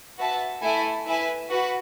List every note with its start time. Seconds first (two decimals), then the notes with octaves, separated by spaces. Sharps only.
0.17 F#4 B4 E5 A5
0.61 A3 E4 A4 E5 G#5
1.06 E4 B4 E5 G#5
1.50 F#4 B4